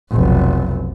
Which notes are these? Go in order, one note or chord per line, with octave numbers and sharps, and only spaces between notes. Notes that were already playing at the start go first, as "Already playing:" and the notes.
F1 B1